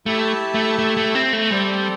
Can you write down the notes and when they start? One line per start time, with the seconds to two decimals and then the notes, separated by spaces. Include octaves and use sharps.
0.06 A3 E4 G4 E5 A5
0.54 A3
0.79 A3
0.97 A3
1.15 C4
1.33 A3
1.51 G3 C4 A4 D5